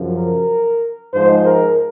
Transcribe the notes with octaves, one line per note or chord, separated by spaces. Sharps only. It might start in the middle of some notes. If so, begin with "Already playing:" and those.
Already playing: F#2 C#3 F3
A#4
G#2 F3 G#3 C5
A#4